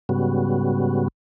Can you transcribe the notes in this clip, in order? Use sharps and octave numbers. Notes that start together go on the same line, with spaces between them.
G#2 C#3 G3 B3 F#4